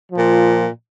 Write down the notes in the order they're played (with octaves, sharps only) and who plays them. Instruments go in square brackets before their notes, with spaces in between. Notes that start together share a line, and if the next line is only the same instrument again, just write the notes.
[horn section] A#2 F3